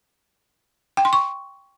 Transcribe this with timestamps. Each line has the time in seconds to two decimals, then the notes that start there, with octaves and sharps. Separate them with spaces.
0.97 G5
1.05 C6
1.13 C#6